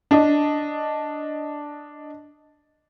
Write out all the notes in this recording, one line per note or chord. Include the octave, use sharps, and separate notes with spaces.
D4 D#5